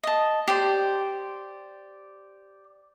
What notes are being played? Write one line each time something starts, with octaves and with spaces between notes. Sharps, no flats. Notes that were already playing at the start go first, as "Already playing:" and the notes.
D#5 A5
G4 C5 D5